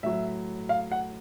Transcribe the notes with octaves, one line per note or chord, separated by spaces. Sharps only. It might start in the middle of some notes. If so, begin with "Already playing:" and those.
A2 F#3 E5
F5
F#5